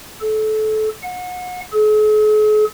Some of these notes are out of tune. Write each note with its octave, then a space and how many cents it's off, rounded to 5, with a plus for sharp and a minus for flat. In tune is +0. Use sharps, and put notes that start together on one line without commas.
A4 -25
F#5 -35
G#4 +45